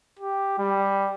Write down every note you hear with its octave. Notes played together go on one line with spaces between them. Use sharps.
G4
G3